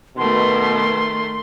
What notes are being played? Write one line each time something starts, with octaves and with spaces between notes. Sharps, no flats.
B2 D#3 A3 C6